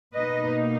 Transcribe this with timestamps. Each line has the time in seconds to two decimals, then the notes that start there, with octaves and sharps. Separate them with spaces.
0.14 B2 A#3 D#4 B4 D#5